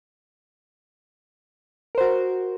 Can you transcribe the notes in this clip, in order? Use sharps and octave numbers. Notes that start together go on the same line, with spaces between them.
F#4 A#4 C5